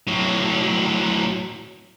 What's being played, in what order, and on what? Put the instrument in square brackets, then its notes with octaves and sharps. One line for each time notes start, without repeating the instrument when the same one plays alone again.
[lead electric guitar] A2 F#3